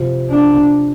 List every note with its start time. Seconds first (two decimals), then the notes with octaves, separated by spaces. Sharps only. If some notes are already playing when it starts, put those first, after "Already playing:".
Already playing: C3 F3 C4
0.30 D4